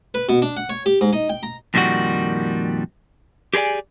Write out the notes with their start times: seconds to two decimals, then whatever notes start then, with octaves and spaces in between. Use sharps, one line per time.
0.14 B4
0.29 B2
0.42 D4
0.57 F#5
0.69 C#5
0.86 G4
1.01 G#2
1.13 D#4
1.29 G5
1.43 A#5
1.74 F2 A#2 D#3 G3 F#4
3.54 G4 G#4 B4 D5 G#5